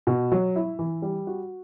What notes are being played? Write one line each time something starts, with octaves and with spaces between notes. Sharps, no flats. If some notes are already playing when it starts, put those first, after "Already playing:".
B2
F#3
E4
E3
G3
F#4